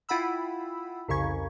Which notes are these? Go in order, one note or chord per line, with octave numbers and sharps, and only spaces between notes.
E4 F4 F#5 G5 B5 E6
C2 F2 C#3 C#6 G#6